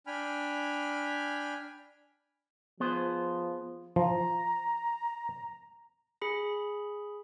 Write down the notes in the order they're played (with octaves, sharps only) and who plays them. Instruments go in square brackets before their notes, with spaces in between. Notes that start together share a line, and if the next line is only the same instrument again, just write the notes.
[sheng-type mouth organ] D4 G5 G#5 B5 F6
[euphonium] F3 [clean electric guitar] B3 G#4 C5
[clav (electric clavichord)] F3 [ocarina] A#5
[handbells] G#4 B5